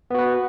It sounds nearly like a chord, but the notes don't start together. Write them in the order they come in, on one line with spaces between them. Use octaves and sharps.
B3 F#4 B4